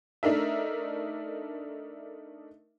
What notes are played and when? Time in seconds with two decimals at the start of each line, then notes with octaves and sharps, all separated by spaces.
0.23 A3 D4 D#4 A#4 E5